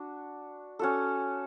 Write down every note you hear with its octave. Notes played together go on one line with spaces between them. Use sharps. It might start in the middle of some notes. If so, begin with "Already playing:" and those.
Already playing: D4 F#4
C#4 F#4 A4